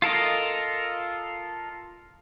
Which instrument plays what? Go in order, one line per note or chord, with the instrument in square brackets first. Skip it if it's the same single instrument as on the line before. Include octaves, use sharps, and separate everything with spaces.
[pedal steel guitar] F4 A4 A#4 D#5